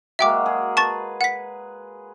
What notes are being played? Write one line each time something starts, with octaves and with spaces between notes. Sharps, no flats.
F#3 G#3 A#3 E5 G5 D6
G#4
B4 A5 C#6 A6
F#5 B6